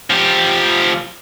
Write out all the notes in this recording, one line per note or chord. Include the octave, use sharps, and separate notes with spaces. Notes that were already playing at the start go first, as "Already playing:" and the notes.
F3 G4